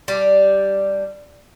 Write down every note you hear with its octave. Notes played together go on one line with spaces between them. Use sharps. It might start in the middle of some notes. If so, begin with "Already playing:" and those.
G3 D4